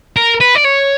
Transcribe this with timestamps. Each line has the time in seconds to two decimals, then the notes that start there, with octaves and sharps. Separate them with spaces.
0.16 A#4
0.41 B4
0.55 D5
0.64 C#5